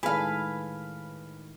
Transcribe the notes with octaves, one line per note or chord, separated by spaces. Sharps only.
A2 D#3 G#3 G#4 A4 B4 F5